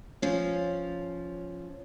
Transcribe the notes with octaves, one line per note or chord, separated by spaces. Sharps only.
F3 C#4